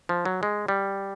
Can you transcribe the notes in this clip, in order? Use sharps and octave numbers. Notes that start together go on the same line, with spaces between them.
F3
F#3
G#3
G3